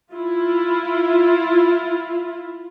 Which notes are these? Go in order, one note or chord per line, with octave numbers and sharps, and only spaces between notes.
E4 F4